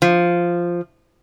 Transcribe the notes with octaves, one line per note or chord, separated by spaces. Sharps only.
F3